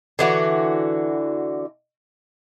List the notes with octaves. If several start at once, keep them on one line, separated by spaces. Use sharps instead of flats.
D3 E3 F#4